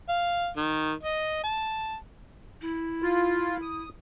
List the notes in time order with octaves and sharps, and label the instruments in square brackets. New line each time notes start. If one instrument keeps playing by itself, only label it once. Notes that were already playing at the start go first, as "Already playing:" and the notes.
[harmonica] F5
D#3
D#5
A5
[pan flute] E4
[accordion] F4
D#6